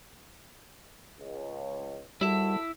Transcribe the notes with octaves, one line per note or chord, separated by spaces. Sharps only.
C#2
G#1 G3 E4 F#4 A4 E5